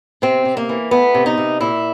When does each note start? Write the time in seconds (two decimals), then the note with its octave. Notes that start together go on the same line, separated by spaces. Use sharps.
0.22 C3 C4
0.45 C3
0.57 A#3
0.69 E3
0.91 A3 B3
1.15 C3
1.26 D#4
1.37 C3
1.60 A#2 E4